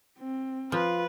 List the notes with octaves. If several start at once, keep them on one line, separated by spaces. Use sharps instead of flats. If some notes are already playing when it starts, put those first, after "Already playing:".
C4
F3 F4 B4